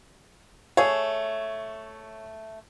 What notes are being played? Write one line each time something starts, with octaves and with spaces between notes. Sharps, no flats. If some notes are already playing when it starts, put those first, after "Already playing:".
A3 G#4 C#5